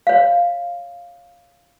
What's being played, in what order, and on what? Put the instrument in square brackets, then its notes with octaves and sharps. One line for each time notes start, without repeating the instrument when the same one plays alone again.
[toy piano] C#5 F5